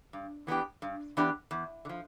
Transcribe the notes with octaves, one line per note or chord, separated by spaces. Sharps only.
G2
E3 B3 D4 G4
G2
E3 B3 D4 G4
E2
D3
F3